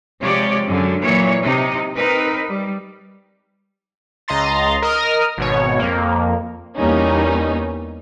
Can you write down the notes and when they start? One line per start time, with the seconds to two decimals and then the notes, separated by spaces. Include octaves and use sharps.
0.21 C3 F3 G#3 G4 C#5 D5
0.67 F#2 D3 F#3
1.02 A#2 E3 F#3 C#5
1.42 C3 D#4
1.95 C4 D#4 A#4 B4
2.48 G3
4.28 C#2 D#5 A#5 C6 A6
4.82 A#4 D#5 D#6 F6
5.37 G#1 B2 C#5
5.79 F2 A#3
6.77 E2 G3 A#3 C#4 D#4